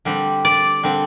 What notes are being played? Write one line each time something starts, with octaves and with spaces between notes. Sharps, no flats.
D3 G3 C4
D5
D3 G3 C4